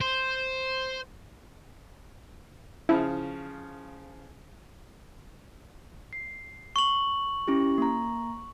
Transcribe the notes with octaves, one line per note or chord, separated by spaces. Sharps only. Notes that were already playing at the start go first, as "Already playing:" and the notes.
C5
C#3 F3 E4
C7
C#6 F#7
C#4 E4 G4
A#3 A#5